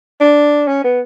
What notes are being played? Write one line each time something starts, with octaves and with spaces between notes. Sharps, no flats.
D4
C#4
B3